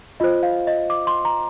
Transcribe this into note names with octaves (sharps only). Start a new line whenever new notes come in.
F4 C5 D#5
F5
D#5
D6
C6
A#5